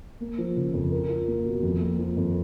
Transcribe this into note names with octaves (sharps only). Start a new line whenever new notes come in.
A#3
F3
C#3
F2
A#4
F4
A#3
B2
F2
A#3
F3
F2